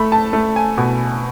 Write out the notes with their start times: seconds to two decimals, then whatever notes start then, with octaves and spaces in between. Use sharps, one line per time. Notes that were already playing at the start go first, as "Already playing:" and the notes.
Already playing: A3 B5
0.12 A5
0.33 A3
0.56 G#5
0.78 B2